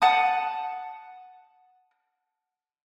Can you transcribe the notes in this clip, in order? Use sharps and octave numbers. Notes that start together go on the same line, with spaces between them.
F#5 A5 D#6